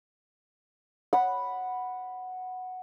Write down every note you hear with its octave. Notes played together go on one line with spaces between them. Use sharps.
F#5 B5